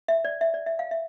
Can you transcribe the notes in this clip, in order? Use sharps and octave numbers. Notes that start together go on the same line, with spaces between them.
E5
D5
E5
D5
E5
F5
E5